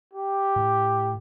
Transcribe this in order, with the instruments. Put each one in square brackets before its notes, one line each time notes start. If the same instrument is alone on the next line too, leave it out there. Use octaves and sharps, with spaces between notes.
[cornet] G4
[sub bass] A2